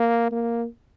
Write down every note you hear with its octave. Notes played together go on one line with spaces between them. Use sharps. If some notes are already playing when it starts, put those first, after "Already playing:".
Already playing: A#3
A#3